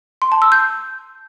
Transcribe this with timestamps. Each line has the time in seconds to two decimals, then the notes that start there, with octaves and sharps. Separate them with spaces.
0.22 C6
0.32 A5
0.42 E6
0.52 G6